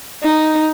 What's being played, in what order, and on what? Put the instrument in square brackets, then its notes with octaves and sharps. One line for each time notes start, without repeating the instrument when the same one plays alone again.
[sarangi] D#4